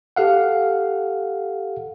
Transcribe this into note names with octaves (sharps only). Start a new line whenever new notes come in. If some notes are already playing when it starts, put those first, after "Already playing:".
G4 A4 F5 F#5